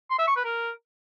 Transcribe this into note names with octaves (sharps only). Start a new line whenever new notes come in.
C6
E5
C#6
B4
A#4